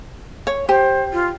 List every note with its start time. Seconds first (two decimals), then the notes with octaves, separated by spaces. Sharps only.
0.47 C#5
0.69 G4 C5
1.13 F4